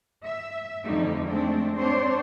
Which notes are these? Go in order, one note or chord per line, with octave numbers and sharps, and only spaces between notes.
E5
F2 D3 G3 A3 D#4
G#3 A3 C4 D4
C4 D4 C5 C#5